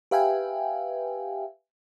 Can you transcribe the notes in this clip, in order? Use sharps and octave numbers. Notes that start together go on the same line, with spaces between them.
G4 B4 E5 F5 G5 G#5